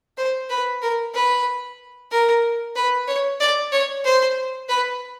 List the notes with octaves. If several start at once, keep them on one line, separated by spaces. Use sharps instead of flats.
C5
B4
A#4
B4
A#4
B4
C#5
D5
C#5
C5
B4